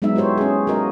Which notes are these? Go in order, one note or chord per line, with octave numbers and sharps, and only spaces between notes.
F#3 G#3 B3 D#4 E5
E4 F#4 G4 C5 C#5
C#4 G#4
A#3 F#4 A#4 D#5